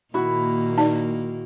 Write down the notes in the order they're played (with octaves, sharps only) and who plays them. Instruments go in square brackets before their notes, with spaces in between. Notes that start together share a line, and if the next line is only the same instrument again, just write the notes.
[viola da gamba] A#2 D#3 A#3 [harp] E4 F#4
[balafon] D#4 D5